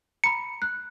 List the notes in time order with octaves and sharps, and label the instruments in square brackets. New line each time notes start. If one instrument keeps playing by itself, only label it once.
[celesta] A#5 B5 [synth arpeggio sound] C#7
[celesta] F#6